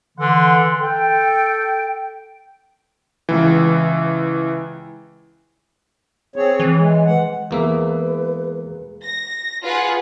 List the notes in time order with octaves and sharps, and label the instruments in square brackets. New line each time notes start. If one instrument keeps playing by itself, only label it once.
[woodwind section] D3 E3 F#5 C6
A4 G5
[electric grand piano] C#2 E3
[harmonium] C4 G#4 C#5
[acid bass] E3
[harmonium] G#3
F#5
[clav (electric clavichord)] E2 A#3 E5 [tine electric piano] G#3 G#4 [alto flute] B4
[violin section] A#6
F4 G#4 B4 F#5